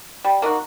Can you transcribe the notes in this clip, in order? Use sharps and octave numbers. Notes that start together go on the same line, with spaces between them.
G3
A#3 D#4 F#4